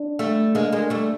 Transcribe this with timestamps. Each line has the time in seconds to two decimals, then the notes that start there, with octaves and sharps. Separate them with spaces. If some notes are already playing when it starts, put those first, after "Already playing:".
Already playing: D4
0.19 G3 A3
0.55 G#3 A#3 D4
0.72 G#3 A#3
0.90 G3 A3